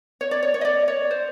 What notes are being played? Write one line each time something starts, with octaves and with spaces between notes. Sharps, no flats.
C#5
D5
C#5
C#5
D#5
D5
C#5
C5